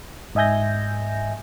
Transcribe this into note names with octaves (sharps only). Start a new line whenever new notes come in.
G#2 D#5 E5 G#5 G6 A#6